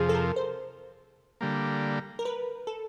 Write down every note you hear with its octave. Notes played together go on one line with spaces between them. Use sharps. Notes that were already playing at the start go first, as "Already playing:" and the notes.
Already playing: F2 C3 F3 G#4
A4
A#4
C5
D3 G3 A#3
A#4
B4
A4